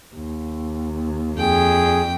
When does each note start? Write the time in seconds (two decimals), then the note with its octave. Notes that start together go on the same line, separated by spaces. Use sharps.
0.14 D#2
1.38 F2 G#4 G5